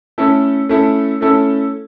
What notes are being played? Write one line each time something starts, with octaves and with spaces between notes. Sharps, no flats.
A3 C#4 E4 A4
A3 C#4 E4 A4
A3 C#4 E4 A4